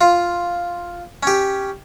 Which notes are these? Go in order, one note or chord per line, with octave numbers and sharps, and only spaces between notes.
F4
C#4 G4